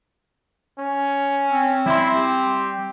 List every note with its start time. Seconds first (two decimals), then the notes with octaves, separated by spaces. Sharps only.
0.78 C#4
1.51 C4
1.86 G3 E4 C6
2.15 G4